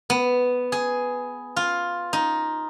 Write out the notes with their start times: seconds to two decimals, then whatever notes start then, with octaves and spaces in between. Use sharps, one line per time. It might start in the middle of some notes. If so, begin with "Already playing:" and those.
0.10 B3
0.72 G#4
1.56 F4
2.13 D#4